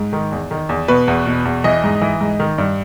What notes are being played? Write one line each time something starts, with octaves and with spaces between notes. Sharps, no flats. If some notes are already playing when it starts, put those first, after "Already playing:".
Already playing: G#2
D#3
E2
D#3
E2
B2 B4
E2
B2
E2
E3 D#5
G#2
E3
G#2
D#3
G2